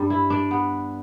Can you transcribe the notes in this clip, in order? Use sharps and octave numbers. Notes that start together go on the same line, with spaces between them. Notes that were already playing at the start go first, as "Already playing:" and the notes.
Already playing: G2 G3
E4
D4
B3